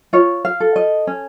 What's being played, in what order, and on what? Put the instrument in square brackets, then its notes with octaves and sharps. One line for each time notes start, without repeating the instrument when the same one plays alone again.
[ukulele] F4 C#5
F5
A4
D#5
C#4